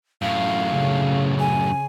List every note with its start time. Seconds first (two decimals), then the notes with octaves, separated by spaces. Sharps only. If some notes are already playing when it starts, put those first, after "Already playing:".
0.22 F#2 A2 F5
0.70 C#3
1.40 G#5